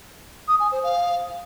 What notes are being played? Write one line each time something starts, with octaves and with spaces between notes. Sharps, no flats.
D#6
G#5
C5
F5